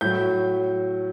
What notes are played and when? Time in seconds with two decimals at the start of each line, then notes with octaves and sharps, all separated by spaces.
0.01 A2 F#3 G6